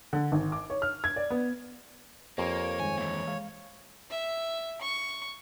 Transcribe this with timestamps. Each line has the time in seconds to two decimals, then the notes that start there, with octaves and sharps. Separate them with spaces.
0.13 D3
0.32 G#1
0.52 D6
0.70 C#5
0.82 F6
1.04 G#6
1.16 D5
1.30 B3
2.38 F2 A#3 G4 C#5
2.80 G2 D#3 G#3 G#5
2.98 E3 A#3
3.28 G#3 F5
4.10 E5
4.81 C#6